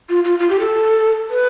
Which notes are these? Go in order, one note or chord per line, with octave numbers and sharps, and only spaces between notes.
F4
F4
F4
G4
A4
B4